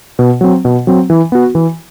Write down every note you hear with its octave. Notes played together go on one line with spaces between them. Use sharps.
B2
F#3 C4
B2
F#3 C4
E3
B3 F#4
E3